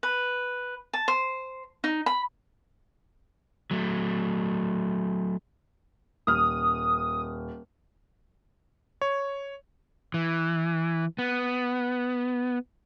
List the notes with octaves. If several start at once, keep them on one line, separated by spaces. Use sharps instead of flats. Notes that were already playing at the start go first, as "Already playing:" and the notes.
B4
A5
C5
D#4
B5
F#3 A3
D#1 D#6 F6
C#5
E3
B3